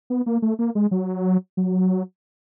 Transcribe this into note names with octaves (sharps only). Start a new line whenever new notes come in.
B3
A#3
A3
A#3
G#3
F#3
F#3